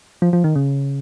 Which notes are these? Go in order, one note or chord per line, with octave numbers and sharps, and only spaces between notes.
F3
F3
D#3
C#3